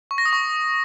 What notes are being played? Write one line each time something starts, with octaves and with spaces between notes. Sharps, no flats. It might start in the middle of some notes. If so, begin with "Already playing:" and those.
C#6
A#6
D#6
C#6